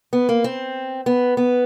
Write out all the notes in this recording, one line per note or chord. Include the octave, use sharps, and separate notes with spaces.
B3
A#3
C4
B3
B3